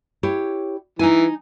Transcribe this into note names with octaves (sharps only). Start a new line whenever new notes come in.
E4 G4 C#5
E3 D#4 G#5